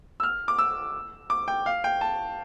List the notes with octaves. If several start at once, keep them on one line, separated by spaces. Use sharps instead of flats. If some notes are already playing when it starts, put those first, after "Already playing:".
E6
F6
D6
E6
D6
G5
F5
G5
A5